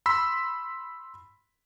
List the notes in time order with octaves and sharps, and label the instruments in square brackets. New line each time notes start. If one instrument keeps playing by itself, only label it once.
[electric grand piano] B5 C6 E6 B6